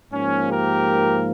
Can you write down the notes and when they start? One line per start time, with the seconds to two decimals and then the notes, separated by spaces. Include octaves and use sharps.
0.12 G#2 F3 A#3 C#4
0.50 G4 A#4